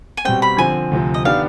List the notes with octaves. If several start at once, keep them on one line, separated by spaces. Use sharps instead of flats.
G#5
B2 G3 C4 G5
B5
D3 F3 C4 G#5
D2 C3 F3
D#5
D#3 B3 D4 G4 F5